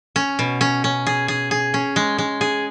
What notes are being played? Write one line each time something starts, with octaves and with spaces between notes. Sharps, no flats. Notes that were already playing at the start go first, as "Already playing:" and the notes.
C#4
B2
C#4
C#4
G#4
G#4
G#4
C#4
G#3
G#3
G#4